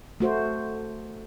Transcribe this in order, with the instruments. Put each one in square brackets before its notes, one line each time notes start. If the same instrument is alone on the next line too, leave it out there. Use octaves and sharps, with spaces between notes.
[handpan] A3 F#4 C5